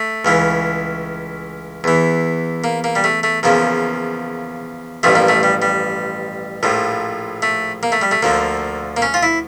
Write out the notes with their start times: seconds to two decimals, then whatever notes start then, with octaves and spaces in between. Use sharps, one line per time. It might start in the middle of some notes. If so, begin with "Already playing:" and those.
Already playing: A3
0.25 C#2 C#3 E3
1.84 E2 E3
2.64 A#3
2.84 A#3
2.96 G3
3.04 A3
3.23 A3
3.43 E2 C#3 F3 A#3
5.03 A1 G2 F3 A3
5.15 A#3
5.28 A3
5.43 G3
5.62 G3
6.63 A#1 A2 F3
7.42 A3
7.83 A#3
7.92 A3
8.02 G3
8.11 A3
8.23 D2 D3 F3 A#3
8.97 A#3
9.02 C#4
9.14 F4
9.23 E4